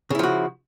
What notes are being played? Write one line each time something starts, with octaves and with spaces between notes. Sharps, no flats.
C#3 F3 E4 F#4